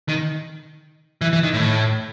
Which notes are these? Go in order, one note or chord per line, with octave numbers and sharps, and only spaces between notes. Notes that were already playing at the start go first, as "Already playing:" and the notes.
D#3
E3
E3
D#3
A2